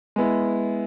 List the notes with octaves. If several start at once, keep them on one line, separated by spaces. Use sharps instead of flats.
G#3 B3 E4